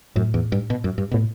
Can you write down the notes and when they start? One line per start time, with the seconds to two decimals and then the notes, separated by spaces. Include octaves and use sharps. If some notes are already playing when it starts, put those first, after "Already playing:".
0.16 F#2 A2
0.34 E2
0.52 G2
0.70 B2
0.84 F#2
0.98 G2
1.11 B2
1.14 A2